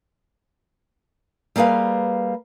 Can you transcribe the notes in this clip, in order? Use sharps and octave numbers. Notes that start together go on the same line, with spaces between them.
G3 A#3 G#4 B4 F5